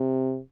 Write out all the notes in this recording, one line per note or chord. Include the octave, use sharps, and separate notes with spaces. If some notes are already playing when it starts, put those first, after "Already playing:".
Already playing: C3